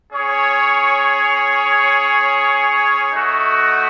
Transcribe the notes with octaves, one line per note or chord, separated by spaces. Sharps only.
C#4 G#4 C#5
A3 D#4 F#4